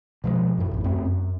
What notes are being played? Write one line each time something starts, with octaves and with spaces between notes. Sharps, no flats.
B2 F3 F#3 G#3
F#2 A2
A1 E2
F#2 A3 C4
F#2